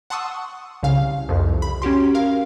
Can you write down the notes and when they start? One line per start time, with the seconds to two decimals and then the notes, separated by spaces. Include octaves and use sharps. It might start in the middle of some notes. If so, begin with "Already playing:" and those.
0.10 F#5 A5 C6 C#6 D#6 E6
0.83 C2 C#3 F5
1.29 C2 F2
1.62 B5
1.82 C#4 F#4 G4 C6
2.14 A#4 F5